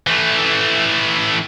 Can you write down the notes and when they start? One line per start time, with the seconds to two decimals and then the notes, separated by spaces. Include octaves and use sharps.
0.07 E3 A3